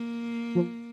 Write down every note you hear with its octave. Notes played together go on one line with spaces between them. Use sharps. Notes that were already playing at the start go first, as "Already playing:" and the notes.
Already playing: A#3
F3